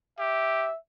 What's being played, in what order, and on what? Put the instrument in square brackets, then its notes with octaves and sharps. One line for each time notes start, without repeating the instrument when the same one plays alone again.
[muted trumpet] G4 [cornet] E5